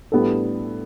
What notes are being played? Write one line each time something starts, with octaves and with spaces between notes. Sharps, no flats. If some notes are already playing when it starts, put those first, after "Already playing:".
A2 G3 B3 D4 A4